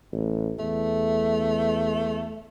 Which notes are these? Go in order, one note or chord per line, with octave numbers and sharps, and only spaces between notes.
A1
E2 A3